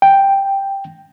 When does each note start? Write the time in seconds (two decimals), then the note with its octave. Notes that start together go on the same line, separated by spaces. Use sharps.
0.02 G5